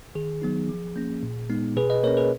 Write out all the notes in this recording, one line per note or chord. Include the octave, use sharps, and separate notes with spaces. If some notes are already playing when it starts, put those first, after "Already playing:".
D#3 G#4
F#3 B3 D#4
F3
A#3 C#4
A#2
G#3 B3 D#4
B2 G#4 B4
B4 D#5
A#3 C#4 A#4 C#5
G#4 B4